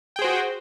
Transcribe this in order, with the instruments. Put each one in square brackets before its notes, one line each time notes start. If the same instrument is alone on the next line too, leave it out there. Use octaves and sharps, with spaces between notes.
[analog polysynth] G5
G#4
C5
F#4